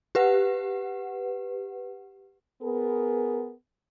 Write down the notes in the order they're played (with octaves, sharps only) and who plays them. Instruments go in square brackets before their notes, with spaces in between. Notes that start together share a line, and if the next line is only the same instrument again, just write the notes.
[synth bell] G4 B4 F#5
[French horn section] B3 G#4 A#4